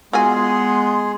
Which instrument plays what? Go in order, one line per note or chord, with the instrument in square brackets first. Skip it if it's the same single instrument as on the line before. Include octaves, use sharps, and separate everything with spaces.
[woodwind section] G#3 B3 [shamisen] F4 F#4 G#5 [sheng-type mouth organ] G#4 [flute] C6